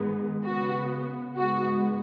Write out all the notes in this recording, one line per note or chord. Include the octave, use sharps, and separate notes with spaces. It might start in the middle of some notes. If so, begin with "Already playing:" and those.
Already playing: G#2 D#3 G#3 B3
C#3 B3 F#4
G#2 G#3 B3 F#4